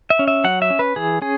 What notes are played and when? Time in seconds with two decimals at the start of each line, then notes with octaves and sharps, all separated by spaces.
0.10 E5
0.19 C#4
0.28 E5
0.44 F#3 F#5
0.62 E5
0.70 C#4
0.79 B4
0.96 E3 G#4
1.22 C#4 G#4